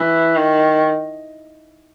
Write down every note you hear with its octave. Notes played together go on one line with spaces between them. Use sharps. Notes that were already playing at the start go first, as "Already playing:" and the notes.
Already playing: E3
D#3